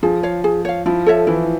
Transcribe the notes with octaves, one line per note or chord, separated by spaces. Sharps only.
F3 G#4
C#5 F5
G#4
C#5 F5
F3 E4
A4 C#5 E5
E3 E4